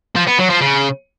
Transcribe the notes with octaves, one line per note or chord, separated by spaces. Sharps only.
F3
B3
F#3
F3
C#3